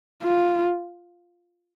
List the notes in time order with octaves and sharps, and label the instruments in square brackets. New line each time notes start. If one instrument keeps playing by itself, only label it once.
[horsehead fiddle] F4